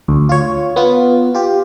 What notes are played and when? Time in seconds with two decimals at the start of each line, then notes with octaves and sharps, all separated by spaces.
0.08 D2
0.29 F4 C#5
0.76 B3 F4
1.34 F4 G4